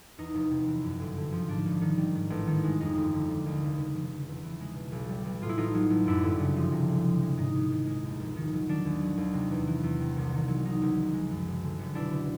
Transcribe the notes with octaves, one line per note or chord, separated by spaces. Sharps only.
E2 D#4
F1
C3
E3
F#2
G1
D3
F3
G#2 D4
G#1
D#3
G3
G#2
A1
D#3
G#3
F2 D#4
G1
D3
G3
D#2
F1
C#3
F1
C#3
E2
E3
G#3
B2
B1
G3
B1
A2 F4
E4
A1 D#4 F4
F#3
A1
F#2 D4 E4
G1
C#3
F3
C3
D2
F3
G#3
G#2 D#4
A#1
D#3
G#3
D#2
F1
D#3
F#3
D#3 D4
D#2
F#3
D#2
C3
E2
E3
E2
C3
C2
D#3
F#3
C3 D#4
C#2
F3
G#3
F#2
F#1
D3
F#1
B2 D4 E4
C#2